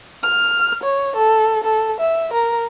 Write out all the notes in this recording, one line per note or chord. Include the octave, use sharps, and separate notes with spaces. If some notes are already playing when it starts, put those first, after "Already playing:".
F6
C#5
A4
A4
E5
A#4